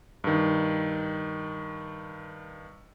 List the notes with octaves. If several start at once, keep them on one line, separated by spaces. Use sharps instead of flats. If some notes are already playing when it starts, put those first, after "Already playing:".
G2 D#3